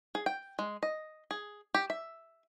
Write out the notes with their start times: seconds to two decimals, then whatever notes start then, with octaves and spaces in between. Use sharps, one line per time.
0.15 G#4
0.26 G5
0.59 G#3
0.83 D#5
1.31 G#4
1.74 G4
1.90 E5